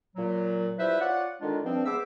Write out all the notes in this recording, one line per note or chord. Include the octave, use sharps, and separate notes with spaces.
A#2 F#3
F3 G3 E4 B4 C5 E5
F4 C#5 D5 F#5
D3 D#3 G#3 D4 F4
G2 F3 C4
G#3 B3 C5 E5 D6 E6